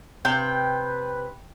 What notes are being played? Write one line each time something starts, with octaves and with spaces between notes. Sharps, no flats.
C3 B4 G5